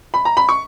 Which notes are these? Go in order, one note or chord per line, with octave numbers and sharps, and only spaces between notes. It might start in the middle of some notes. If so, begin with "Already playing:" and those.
B5
A#5
B5
C#6